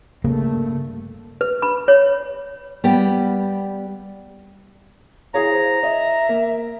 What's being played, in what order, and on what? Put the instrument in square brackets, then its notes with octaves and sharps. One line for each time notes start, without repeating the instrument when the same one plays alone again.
[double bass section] G2 A3 [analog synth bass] C#3 [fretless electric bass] A#3
[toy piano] B4
B5
C#5
[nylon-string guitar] G3 B3 G4
[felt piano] E4 G#4 C#5 [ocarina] F5 [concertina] A#5
[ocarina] C5
[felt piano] D#5 [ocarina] E5
[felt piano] A#3